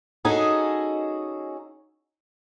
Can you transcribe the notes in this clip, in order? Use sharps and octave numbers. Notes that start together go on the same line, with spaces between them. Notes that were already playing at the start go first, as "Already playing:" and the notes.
C#4 D#4 F#4 G#4 A4 D#5